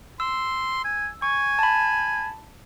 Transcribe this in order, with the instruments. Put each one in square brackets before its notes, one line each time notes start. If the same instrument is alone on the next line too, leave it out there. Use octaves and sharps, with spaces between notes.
[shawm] C6 [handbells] E6
[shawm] G#5
[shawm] G#5 [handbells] C#6
[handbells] A5 B5